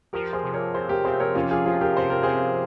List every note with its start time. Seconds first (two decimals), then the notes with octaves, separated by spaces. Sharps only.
0.13 F3 G4 A#4
0.33 G#4 C5
0.44 C3
0.54 A#4 C#5
0.74 C3 G#4 C5
0.89 G4 A#4
1.04 C4 G#4 C5
1.20 A#4 C#5
1.35 C3 C#4 F4
1.51 F4 G#4
1.66 F3 F4 G#4
1.81 G4 A#4
1.97 C3 C5
2.10 A#4
2.23 C3 G#4 C5